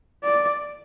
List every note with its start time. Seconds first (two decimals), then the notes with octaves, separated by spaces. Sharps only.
0.24 D5